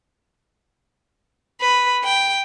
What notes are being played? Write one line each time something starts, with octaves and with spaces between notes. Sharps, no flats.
B4
G5